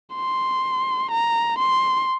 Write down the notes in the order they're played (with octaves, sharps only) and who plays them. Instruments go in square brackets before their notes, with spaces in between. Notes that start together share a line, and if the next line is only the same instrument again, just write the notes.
[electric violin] C6
A#5
C6